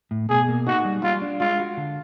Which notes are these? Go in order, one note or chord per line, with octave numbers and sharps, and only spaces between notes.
A2
B2 G#4
A#3
D#4 F#4
G3
G3 F4
D4
G#3 F4
F#4
D3